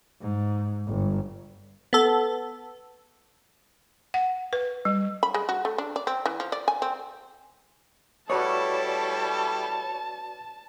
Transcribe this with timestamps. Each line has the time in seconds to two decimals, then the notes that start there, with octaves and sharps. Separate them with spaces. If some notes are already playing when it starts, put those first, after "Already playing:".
0.21 G#2
0.87 G1
1.93 B3 A4
4.14 F#5
4.53 B4
4.85 G3
5.23 B5
5.34 G#3
5.49 F#4
5.65 A3
5.78 D4
5.96 D5
6.07 C4
6.26 E3
6.40 F3
6.52 D5
6.68 G#5
6.82 C4
8.30 G3 E4 F#4 A4 B4 C#5 D5 A5